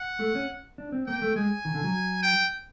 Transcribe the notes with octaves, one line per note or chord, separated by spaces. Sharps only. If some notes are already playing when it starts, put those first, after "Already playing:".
Already playing: F#5
A3
C#4
D4
C4
A#3 G5
A3
G#3 G#5
D#3
D3
F#3
G5